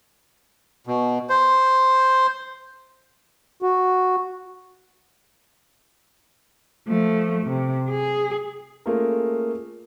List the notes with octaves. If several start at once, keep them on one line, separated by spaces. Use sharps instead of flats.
B2
C5
F#4
F3 A3
C3
G#4
A3 A#3 C#4 F4 G#4 A#4